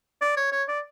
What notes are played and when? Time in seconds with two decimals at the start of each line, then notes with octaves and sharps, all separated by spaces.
0.21 D5
0.37 C#5
0.52 C#5
0.68 D5